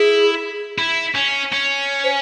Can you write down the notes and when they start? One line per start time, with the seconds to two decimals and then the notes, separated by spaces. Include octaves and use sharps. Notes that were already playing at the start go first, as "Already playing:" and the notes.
Already playing: E4 G#4
0.78 E4
1.15 C#4
1.53 C#4
2.04 C5